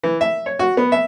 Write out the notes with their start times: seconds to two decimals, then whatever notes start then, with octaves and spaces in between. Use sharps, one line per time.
0.03 E3
0.21 E5
0.46 C#5
0.59 F#4
0.77 B3
0.92 E5